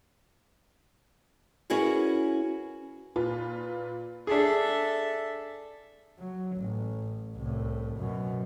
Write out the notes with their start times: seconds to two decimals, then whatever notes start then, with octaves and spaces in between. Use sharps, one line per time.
1.70 C#4 E4 F#4 G#4 A#4 B4
3.16 A#2 F4 B4
4.27 D4 G#4 A4 E5
6.19 F#3
6.57 A1
7.37 C2 A2
7.97 F#2 B2